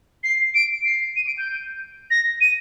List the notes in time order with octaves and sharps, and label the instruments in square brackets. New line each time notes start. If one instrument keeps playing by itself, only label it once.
[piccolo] C7
D7
C7
D#7
D7
G6
A#6
D#7